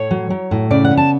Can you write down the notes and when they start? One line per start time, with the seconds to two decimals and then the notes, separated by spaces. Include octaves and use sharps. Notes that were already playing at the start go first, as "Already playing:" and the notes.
Already playing: A2 C#5
0.11 F#3
0.30 F#3
0.51 A2
0.70 C#3 D5
0.84 F#5
0.91 B3
0.97 A5